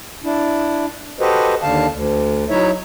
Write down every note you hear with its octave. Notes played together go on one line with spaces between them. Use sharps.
D4 E4
F#4 G4 A4 B4 C5 D#5
D#2 D3 F5 A5
D2
F#3 D#4 E4 C#5 E5